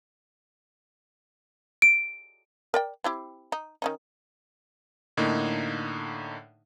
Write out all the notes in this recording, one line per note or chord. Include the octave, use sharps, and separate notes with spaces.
D7
A#4 D5 G5
C4 E4 G4
D#4
D#3 C#4 D#4
A2 D3 A#3 D#4